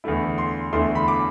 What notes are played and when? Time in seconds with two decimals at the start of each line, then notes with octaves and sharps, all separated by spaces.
0.04 E2 D3 A3 E4
0.38 C6
0.73 E2 D3 A3 E4 C6
0.95 B5
1.08 D6